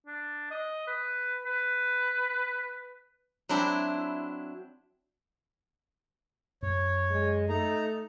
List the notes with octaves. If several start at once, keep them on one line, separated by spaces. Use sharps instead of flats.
D4
D#5
B4
B4
F#3 C4 D4 E4
F#2 C#5
G#3
A3 D#4 A#5